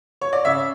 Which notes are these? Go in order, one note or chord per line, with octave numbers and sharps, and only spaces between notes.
C#5
D5
C#3 C#5 E5